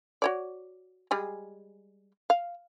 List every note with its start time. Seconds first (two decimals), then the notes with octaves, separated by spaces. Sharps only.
0.22 F#4 C#5 D5
1.11 G3 G#3 G#4
2.30 F5